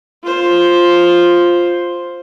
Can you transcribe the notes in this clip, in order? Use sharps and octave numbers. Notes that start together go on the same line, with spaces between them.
F4 C5